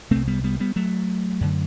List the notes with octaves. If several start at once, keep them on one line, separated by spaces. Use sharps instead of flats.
C2 C3 A3 C4
G3 B3
G3 B3
G3 B3
F#3 A3
F#2 D3